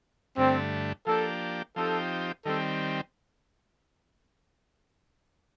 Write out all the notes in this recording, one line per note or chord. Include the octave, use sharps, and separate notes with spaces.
G2 D3 A3 C4
F3 A#3 D4 G4 A4
F3 C4 D#4 G4 A4
D#3 G3 C4 A4